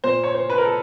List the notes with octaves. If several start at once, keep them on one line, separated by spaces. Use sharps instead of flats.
A#2 C5
C#5
C5
B4
A#4
A4